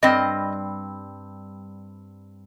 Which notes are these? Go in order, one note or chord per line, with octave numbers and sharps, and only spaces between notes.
G2 G3 C4 D#5